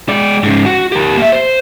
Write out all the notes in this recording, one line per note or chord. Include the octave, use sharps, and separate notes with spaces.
G#3 D5
G#2 C#3
F#4
G4 A#4
A#3 E5
C5